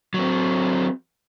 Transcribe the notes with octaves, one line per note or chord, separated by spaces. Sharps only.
F#3 C4